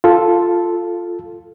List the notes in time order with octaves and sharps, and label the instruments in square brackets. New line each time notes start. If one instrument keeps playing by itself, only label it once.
[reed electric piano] F4 A4